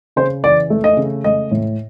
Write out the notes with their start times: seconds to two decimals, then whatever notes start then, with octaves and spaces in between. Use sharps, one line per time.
0.16 C#3 C5
0.44 E3 D5
0.70 A3
0.84 D#5
0.97 C#3
1.24 A3 D#5
1.51 A2